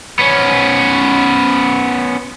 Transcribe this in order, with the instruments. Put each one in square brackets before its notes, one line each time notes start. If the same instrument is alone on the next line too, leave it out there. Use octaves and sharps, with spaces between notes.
[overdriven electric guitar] B3 C#4